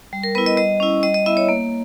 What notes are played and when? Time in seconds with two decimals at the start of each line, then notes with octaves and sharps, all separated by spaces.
0.13 G3
0.24 A#4
0.35 B3 E4 B4
0.46 D#5
0.57 G3 D#5
0.80 C#4 E4
1.03 G3 D#5
1.14 D#5
1.26 B3 E4 E5
1.37 C#5
1.49 A#3